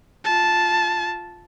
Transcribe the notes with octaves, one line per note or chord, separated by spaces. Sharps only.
F4 A5